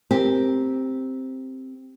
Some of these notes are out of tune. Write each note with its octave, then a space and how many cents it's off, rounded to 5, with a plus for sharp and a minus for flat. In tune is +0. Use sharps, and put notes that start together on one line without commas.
C4 +0 G4 +0 A#4 +0